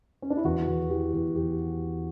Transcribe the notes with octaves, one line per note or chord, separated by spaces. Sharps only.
C#4
D4
E4
E2 F#4
E2
E3 G4
E2
E2 G4